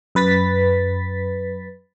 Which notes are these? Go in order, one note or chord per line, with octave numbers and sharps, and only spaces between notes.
F#2 B4 A6 B6